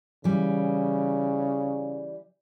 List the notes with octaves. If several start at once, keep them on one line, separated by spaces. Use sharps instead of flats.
C#3 E3 G3